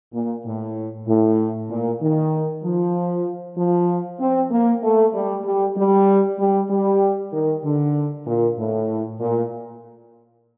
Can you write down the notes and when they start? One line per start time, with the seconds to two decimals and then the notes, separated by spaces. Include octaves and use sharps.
0.14 A#2
0.46 A2
1.08 A2
1.70 A#2
2.02 D#3
2.64 F3
3.58 F3
4.20 C4
4.52 A#3
4.84 A3
5.14 G3
5.45 G3
5.78 G3
6.39 G3
6.70 G3
7.33 D#3
7.64 D3
8.27 A#2
8.59 A2
9.20 A#2